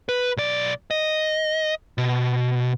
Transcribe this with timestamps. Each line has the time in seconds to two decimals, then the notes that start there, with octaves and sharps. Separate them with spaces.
0.09 B4
0.37 B1 D5
0.91 D#5
1.98 B2